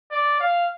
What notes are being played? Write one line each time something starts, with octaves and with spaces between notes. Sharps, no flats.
D5
F5